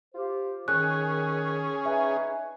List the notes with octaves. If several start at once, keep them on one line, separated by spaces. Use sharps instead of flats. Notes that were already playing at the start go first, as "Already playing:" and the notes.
F4 G4 C5
D#3 C#4 G#4 F#6
D#4 B4 E5 G#5